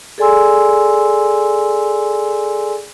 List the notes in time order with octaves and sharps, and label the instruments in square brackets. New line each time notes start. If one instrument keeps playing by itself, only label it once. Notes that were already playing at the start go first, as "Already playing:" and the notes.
[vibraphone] G#4 A4 D5 G#5 C6 E6